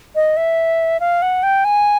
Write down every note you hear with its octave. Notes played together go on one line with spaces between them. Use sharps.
D#5
E5
F5
F#5
G5
G#5